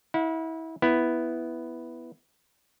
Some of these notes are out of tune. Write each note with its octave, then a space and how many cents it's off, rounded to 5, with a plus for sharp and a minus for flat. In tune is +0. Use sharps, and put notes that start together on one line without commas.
E4 -30 F#5 -45
B3 +0 E4 +0